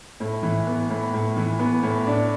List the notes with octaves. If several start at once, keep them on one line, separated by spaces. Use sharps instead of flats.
A2
E3
B3
A2
A2
E3
B3
A2
D4